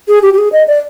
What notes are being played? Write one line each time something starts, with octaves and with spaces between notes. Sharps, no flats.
G#4
G4
G4
G#4
D#5
D5